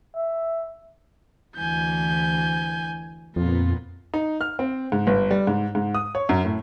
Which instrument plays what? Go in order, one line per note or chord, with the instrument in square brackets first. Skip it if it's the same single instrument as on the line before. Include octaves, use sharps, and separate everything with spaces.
[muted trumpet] E5
[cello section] D2 E3 [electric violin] G#5 G6
[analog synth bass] F2 [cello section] A#2 B3 [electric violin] F4
[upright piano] D#4
F6
C4
G#2
G1
G3
G#2
G#2
D#6
C#5
F#2
A2